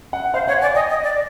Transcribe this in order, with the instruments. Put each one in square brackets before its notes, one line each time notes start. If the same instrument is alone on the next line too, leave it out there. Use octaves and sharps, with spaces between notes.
[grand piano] F#5
[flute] C5 [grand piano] F5
[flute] C#5 [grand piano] F#5
[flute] D5 [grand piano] G#5
[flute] D#5 [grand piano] G5
[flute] D#5
D5